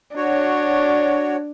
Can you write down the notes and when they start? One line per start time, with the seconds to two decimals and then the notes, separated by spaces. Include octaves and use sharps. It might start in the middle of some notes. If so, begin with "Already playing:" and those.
0.16 D4 F#4 C#5